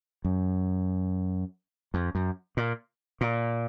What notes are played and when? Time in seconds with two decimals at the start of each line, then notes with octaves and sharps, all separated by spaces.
0.25 F#2
1.94 F2
2.15 F#2
2.57 A#2
3.21 A#2